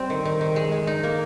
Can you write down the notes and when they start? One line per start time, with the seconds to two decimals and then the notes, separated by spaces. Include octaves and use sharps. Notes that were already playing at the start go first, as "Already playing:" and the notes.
Already playing: G3 C4
0.10 D#3
0.25 D#3
0.41 D#3
0.56 G#3
0.72 G#3
0.87 D#4
1.03 A#3